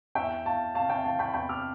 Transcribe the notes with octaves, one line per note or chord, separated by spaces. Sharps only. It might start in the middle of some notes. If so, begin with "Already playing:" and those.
E2 E5 G5
E2 F5 A5
C3 F5 A5
E5 G5
E3 F5 A5
G5 B5
E2 G5 B5
D6 F6